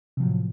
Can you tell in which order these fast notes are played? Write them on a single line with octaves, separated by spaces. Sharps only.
C3 F3 F#3 A2